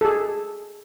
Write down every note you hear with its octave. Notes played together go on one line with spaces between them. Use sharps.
G#4 A4